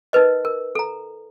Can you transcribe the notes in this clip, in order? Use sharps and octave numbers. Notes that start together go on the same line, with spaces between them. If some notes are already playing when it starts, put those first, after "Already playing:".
D#4 A#4 B4 D#5
A#4
A4 A#5